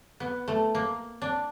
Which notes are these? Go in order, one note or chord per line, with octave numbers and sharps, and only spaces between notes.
B3
A3
A#3
D4